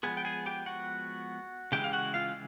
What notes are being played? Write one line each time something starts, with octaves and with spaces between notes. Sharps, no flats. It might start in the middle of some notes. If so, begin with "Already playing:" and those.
F3 G#3 B3 G#4 G#5
G5
G#4 G#5
G4 G5
F#4 F#5
C#3 E3 G#3 G4 G5
F5
F#4 F#5
F4 F5